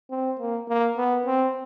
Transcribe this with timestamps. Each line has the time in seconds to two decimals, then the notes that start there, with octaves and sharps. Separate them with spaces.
0.10 C4
0.39 A#3
0.68 A#3
0.97 B3
1.26 C4